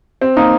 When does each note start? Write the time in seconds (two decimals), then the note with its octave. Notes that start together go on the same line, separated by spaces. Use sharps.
0.21 C4
0.37 A#3 D#4